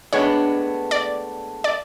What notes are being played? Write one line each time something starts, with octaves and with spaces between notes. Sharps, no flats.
A2 G#3 B3 D4 C#5
D5
D5